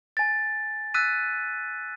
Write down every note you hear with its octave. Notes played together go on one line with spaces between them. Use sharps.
G#5 A6
E6 F#6 A6 B6 D#7